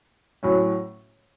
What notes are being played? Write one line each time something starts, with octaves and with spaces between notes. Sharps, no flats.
A2 F#3 C#4